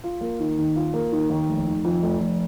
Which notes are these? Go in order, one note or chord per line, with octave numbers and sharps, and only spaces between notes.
F4
A#3
D#3
D#2
F4
A#3
D#3
D#2
F1
D#3
F2
F1
F1